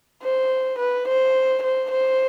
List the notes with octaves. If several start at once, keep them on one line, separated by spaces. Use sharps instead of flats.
C5
B4
C5
C5
C5